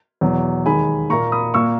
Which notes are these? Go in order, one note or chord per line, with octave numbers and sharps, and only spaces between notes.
E2 B2 F#3
D#2 D#3 G#3 G#5 B5
A#2 A#3 A#5 C#6
B5 D#6
A#2 A#3 C#6 E6